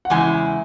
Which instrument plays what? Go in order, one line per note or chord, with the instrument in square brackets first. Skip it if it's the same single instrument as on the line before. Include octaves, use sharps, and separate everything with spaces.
[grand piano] F#5
[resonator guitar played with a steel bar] E2 C#3 G#3 E4 [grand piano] G#5